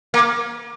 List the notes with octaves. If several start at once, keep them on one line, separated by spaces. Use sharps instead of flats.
A#3